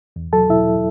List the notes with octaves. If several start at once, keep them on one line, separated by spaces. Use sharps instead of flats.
E2
F#3 A4 A5
B2 E4 E5